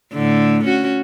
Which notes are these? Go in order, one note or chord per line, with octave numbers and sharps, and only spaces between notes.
A2 D3
C#4 F#4